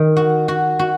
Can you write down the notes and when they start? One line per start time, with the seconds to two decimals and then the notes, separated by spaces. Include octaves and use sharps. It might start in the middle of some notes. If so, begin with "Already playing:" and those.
Already playing: D#3
0.16 F#4
0.48 F#4
0.79 F#4